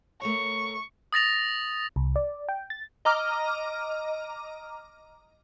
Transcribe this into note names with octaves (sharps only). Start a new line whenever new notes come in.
A3 A#4 C#5 C#6
D#6 A6 A#6 F7
C2
D5
G5
A6
D#5 A#5 D6 F6